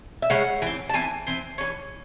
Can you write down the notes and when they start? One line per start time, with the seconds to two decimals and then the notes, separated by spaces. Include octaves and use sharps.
0.22 E5
0.30 C#3 G#3 C#4 F#5
0.62 E3 C4
0.89 A5
0.94 E3 C4 G#5
1.27 E3 C4
1.58 E3 G#3 C#4